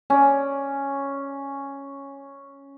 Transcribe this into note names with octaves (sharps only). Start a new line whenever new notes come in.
C#4 D5